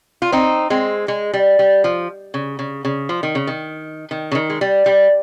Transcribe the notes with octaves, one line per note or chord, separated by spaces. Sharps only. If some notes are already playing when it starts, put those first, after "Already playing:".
F4
C4 D#4
G#3 C4
G#3
G3
G3
F3
C#3
C#3
C#3
F3
D#3
C#3
D#3
D#3
C#3
D#3
G#3
G3
G3